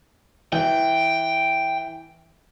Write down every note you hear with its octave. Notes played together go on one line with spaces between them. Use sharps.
E3 G5